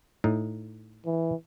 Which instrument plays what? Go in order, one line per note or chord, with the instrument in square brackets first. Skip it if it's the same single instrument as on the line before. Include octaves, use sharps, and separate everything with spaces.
[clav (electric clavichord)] A2 D#4
[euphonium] E3